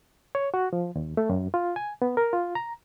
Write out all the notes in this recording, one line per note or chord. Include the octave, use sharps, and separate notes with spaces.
C#5
F#4
F3
D#2
A3
F#2
F4
G#5
B3
A#4
F4
A#5